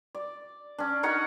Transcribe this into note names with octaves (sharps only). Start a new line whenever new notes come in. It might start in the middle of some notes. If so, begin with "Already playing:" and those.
D5
C#4 D4
D#4 A#4 C#5 F#5